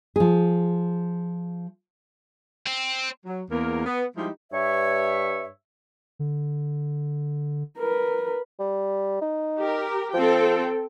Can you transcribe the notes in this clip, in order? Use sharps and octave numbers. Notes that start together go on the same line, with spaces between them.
F3 G#4
C4
F#3
E2 A#3 A#4
B3
F3 G3 G#3 D#4 E4 G4
G2 C#5 E5
D3
A#4 B4
G3
D#4
G4 A#4
F3 C4 A4 G5